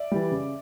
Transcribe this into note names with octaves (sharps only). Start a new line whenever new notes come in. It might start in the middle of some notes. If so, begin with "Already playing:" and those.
Already playing: D5 E5
E3 G3
C#3